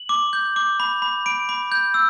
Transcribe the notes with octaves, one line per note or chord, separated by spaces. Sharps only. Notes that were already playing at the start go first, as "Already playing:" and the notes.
Already playing: F#7
D6
G6
D6
B5
B5
B5 D7
B5
G6
E6